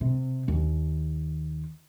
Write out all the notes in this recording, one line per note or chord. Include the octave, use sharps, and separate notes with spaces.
C3
D#2